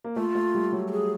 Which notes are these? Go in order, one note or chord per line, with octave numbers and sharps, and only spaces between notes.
A#3
A3 F4
A3
G3
F#3
G4
G#4